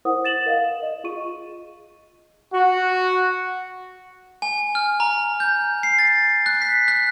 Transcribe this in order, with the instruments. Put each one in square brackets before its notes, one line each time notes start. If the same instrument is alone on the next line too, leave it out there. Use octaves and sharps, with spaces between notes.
[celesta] E4 A#4 C5 F#5 D#6
A6 E7 F#7
A#4 D#5 F5
D#5
F4 G#4 C#6 D#7
[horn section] F#4
[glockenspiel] G#5
F6
A#5
G6
C7
A6
F#6
B6
F#6